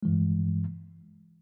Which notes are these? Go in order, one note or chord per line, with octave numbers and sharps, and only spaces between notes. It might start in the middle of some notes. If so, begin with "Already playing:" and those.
G2 E3 G#3